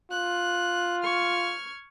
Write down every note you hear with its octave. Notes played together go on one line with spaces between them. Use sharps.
F4 F#6
C#6 F6 G#6